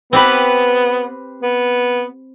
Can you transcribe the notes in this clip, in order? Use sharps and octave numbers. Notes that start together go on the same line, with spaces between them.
B3 C4 G4 B4
B3